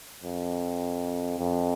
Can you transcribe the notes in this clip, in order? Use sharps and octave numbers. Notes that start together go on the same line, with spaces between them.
F2
F2